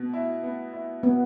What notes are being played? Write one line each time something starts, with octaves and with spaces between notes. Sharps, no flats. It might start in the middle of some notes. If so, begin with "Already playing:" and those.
Already playing: B2 B3
E4
B3
E4
B2 B3